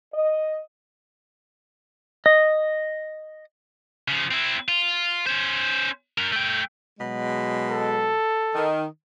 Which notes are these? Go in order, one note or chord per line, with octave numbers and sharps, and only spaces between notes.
D#5
D#5
C#3 F3
C4 E4
F4
C#4 C5
F#2 A#4
A3 G5
B2 F#3 G#3
A4
D#3